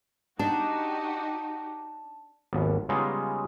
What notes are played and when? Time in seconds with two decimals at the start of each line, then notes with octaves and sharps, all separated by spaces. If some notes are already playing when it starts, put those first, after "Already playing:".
0.39 D4 D#4 F#4 G4 A5
2.53 G#1 D#2 B3
2.89 C#3 G3 G#3 B3 D#4 F4